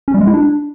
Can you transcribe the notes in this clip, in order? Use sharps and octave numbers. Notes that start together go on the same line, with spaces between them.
C#4
G3
G#3
E4
D4